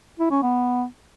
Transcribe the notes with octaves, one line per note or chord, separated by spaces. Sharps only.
E4
C#4
B3